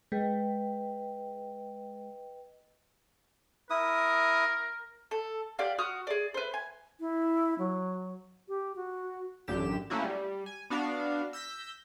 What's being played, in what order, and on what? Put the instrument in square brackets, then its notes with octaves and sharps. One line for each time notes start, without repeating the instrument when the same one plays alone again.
[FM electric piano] G#3 [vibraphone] B4 D#5 G5
[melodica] E4 D#6 [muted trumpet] A#4
[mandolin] A4
G4 D5 F5 F#5
F#4 D#6 F6
G#4 D5
B4 C5
G#5
[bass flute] E4
F#3
G4
F#4
[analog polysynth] A1 F#2 D3 G4 E7
A3 A#3 C#4 E4 F#4
G3
G#5
B3 D4 F#4 F5
E6 G6 A#6 B6